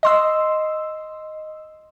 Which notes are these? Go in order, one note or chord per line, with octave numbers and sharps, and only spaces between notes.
D#5 C6 E6